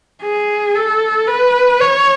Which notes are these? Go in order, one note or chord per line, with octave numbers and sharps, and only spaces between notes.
G#4
A4
B4
C#5